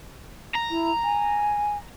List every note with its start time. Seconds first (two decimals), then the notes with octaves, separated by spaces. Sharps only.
0.55 A#5
0.70 E4
1.04 G#5